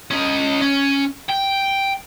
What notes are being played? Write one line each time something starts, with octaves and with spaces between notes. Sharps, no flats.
C#4 D#5
C#4
G5